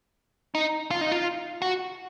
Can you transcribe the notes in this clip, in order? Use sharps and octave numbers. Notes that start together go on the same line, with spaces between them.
D#4
F4
D#4
F4
F#4